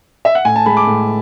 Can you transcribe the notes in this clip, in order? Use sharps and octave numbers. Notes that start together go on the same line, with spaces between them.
E5
F#5
A2 G#5
A5
G#3 B5
D6
A2